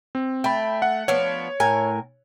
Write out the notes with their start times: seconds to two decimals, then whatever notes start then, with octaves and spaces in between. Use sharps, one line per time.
0.15 C4
0.44 A3 G5 B5
0.82 F#5
1.08 F3 B3 D4 C#5
1.60 A2 A#4 G#5